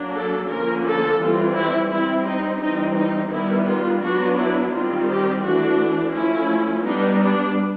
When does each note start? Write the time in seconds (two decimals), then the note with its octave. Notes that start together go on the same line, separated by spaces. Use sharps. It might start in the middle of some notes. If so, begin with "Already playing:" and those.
Already playing: F#3 A#3 D4
0.14 A4
0.49 D3 F3 A#3 C#4 A#4
0.84 A4
1.19 E3 G3 C4 F4
1.55 E4
1.91 G3 C4 E4
2.26 D#4
2.61 E3 G3 C4 D#4
2.96 D#4
3.31 D#3 G3 B3 E4
3.67 F4
4.03 F#3 B3 D4 F#4
4.38 E4
4.73 D#3 G3 C4 F4
5.09 G4
5.43 E3 A3 D4 F#4
6.14 F3 A3 C#4 E4
6.85 G3 B3 D4 D#4
7.20 D4